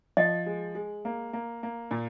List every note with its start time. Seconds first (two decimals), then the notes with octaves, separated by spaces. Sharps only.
0.17 F3 D#5
0.46 G#3
0.75 G#3
1.05 A#3
1.33 A#3
1.63 A#3
1.91 A#2